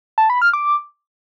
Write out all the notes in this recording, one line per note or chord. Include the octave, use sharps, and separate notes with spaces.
A5
B5
F6
D6